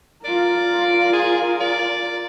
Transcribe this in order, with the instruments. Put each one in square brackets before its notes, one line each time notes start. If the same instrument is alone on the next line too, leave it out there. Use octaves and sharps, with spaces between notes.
[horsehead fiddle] F4 A#4 [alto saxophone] D5
[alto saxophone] G#4
D5